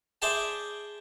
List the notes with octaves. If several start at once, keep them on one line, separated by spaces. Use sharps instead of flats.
G#4 C5 D5 E5 G5 A5